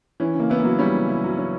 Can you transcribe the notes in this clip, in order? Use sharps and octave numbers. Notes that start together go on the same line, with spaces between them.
E3 C#4
C#3
A#3
B3 E4
A#3
F#3
G3 C#4
C#3
E4
F#3
C#4